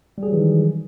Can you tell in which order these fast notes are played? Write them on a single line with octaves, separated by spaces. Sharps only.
G3 G#4 F#3 E3 D#3